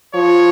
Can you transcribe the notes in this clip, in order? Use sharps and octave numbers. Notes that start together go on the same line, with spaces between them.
F3 C#5